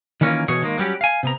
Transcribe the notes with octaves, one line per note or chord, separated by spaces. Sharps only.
D#3 E3 A#3 C#4 F4 A#4
B2 E3 F#4 G#4 C#5
D#3 G#3 A#3
F#3 G3 C#4 G4
F5 G#5
C3 B3 A#5